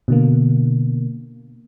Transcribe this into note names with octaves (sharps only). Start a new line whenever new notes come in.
B2 D3 A#3